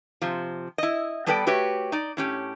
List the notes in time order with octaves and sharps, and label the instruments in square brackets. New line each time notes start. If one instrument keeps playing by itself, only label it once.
[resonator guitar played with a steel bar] C3 F3
E4 D#5
G3 B3 A4 B4 D5 G5
A3 F#4 G4 B4 C#5
D#4 D5
A2 C#4 G4